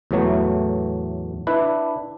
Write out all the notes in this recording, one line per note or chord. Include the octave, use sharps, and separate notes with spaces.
E2 A2 E3 F#3 A3
D4 E4 B4